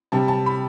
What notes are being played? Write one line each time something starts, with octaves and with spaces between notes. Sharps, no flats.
C3 G3 A5
A5
B5